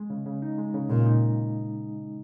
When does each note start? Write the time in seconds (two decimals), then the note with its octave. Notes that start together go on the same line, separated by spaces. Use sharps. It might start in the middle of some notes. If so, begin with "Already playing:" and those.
Already playing: G#3
0.10 C#3
0.26 C#3
0.42 D#4
0.58 G#3
0.74 C#3
0.89 A#2 C#3
1.05 D#4